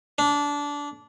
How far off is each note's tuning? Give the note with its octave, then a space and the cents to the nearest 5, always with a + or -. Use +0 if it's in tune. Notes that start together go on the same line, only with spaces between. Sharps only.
D4 -20